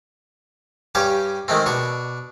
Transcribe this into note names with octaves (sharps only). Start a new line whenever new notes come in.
G2 C#4 G4 D6
D#3 G#3 A3 C4
B2 D4 C#6